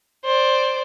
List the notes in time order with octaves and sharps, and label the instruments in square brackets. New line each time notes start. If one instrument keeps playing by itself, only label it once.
[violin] C5 D5